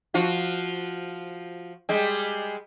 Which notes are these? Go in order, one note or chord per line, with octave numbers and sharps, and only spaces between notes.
F3 F4 F#4
G3 G#3